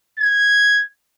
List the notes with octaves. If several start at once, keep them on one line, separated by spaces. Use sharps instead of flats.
G#6